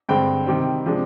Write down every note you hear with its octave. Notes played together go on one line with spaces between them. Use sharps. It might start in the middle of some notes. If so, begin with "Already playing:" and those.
G2 D3 G#3 C4 G5
C3 D#3 G3 C4
C3 F3 G#3 D4